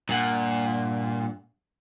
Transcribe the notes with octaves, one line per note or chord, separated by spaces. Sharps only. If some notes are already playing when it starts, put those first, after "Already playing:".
G2 A#2 F#5